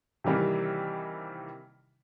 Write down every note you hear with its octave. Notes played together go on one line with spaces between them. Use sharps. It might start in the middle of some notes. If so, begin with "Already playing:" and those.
C3 D#3 E3 G3 A#3